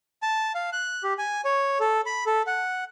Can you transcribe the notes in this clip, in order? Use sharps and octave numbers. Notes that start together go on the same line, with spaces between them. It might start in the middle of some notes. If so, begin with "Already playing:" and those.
A5
F5
F#6
G4
G#5
C#5
A4
B5
A4
F#5